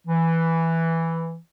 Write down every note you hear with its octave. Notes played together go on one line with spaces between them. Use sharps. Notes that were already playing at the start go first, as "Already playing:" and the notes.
E3